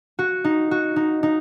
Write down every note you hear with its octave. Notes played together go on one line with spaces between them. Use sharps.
F#4
D#4
F#4
D#4
D#4